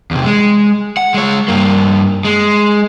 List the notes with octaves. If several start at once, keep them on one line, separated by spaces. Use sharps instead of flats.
E2 C3
G#3
F#5
G#3 C#5
G2 A#3
G#3